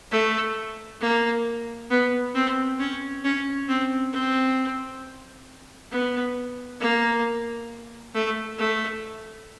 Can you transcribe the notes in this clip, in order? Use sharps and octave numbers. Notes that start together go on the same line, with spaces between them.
A3
A#3
B3
C4
C#4
C#4
C4
C4
B3
A#3
A3
A3